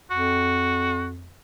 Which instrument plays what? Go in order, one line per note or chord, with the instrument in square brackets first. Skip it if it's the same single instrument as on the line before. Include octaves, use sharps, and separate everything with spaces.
[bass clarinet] F2 [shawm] F#4